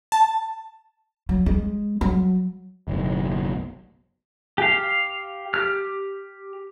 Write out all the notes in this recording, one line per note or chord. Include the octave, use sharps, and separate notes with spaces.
A5
F#3
G#3
F#3
F#1 B1
G4 F5
G4 F6